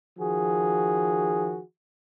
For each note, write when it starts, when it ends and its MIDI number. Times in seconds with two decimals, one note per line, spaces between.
0.18 1.60 51
0.18 1.60 53
0.18 1.60 66
0.18 1.60 68